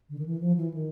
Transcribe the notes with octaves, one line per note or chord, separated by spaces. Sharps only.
D3
D#3
E3
F3
E3
D#3